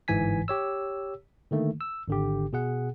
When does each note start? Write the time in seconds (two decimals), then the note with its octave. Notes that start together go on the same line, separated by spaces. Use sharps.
0.08 G1 G#2 E3 G#5 B6
0.48 G4 C#5 E6
1.51 D3 D#3 A3 A#3
1.81 E6
2.08 G#1 D3 G4
2.53 B2 G#4 F#5